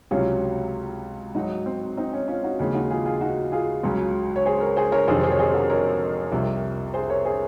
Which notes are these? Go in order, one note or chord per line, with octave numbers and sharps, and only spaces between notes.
C#2 C3 F#3 C#4 F4
G#2 F#3 D#4 F#4
C4
C4 D#4
C#4
C#4 F4
D#4 F#4
D#2 C#3 F3 G#3
D#4 F#4
F4 G#4
F4 G#4
D#4 F#4
F4 G#4
C#2 C#3 F#3
C#5
G#4 C5
A#4 C#5
G#4 C5
A#4 C#5
F2 C3 D#3 F#3 G#4 C5
G#4 C5
C#5
G#4 C5
F#4 A#4
A#4 C#5
C2 C3 F3
G#4 C5
A#4 C#5
G#4 C5